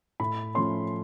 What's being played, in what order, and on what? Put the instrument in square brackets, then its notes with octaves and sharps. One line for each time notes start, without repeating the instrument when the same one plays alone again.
[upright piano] A2 B5
F3 A3 C#4 C6